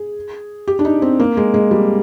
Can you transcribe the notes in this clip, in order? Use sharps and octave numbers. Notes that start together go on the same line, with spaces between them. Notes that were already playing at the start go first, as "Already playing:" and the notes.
Already playing: G#4
G4
D4
D#4
C4
A#3
G#3
G#3
G3